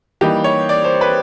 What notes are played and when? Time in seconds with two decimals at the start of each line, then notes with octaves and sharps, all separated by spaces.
0.21 E3 G3 A#3 D#4 G4
0.44 C#5
0.69 D5
0.84 C5
1.01 B4